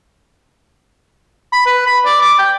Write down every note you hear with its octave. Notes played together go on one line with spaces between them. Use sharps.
B5
B4
B5
D5
D6
G5